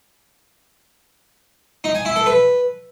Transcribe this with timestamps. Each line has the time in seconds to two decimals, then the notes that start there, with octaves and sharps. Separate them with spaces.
1.84 D#4
1.95 G#5
2.05 E4
2.16 A4
2.26 B4